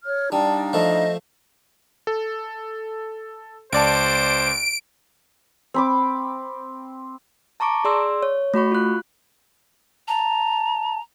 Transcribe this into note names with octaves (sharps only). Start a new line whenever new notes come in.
C#5 F6
G3 D4 D#4 F5 A5
F3 A3 D#5
A4
C#2 C5 D5 A5 D7
C4 B5 D6
A5 A#5 C#6 D6 D7
G#4 D5 C6 E6
C#5
A3 F#4 B5 C#6
F4 F#6
A5 A#5